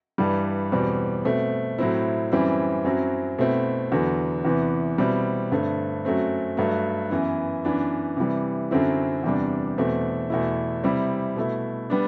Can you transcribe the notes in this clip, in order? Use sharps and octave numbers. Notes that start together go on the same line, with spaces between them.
G2 E3 G3
E2 B2 G3 C4
B2 A3 C4
A2 F#3 C4 E4
F#2 E3 G3 C4 E4
F#2 F#3 C4 E4
B2 A3 C4 E4
E2 D3 F#3 B3
E2 C3 E3 B3
B2 G3 C4 E4
G2 D3 A3 C4
F#2 F#3 A3 C4
G2 F#3 A3
F#2 E3 B3 E4
F#2 E3 B3 D4
C3 E3 G3
F#2 D3 F#3 C4 E4
E2 C3 G3 D4
E2 B2 A3 C4
E2 B2 A3 E4
C3 G3 C4 E4
B2 A3 E4
G3 B3 D4